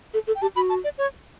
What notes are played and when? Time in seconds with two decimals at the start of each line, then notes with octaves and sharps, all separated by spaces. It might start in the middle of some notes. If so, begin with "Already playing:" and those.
0.14 A4
0.27 A4
0.35 G5
0.42 G4 A5
0.56 F#4 B5
0.70 A5
0.84 D5
0.98 C#5